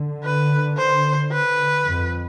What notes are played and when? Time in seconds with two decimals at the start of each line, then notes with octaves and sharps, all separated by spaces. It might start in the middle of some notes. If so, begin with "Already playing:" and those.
Already playing: D3
0.23 B4
0.77 C5
1.32 B4
1.87 F2